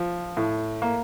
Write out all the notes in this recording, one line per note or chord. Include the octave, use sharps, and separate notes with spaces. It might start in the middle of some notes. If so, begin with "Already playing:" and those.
Already playing: F3
A2
A#3